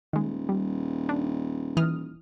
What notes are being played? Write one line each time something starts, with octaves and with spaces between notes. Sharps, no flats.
D#1 D#3 G#3
G3
D4
E3 D#6 F6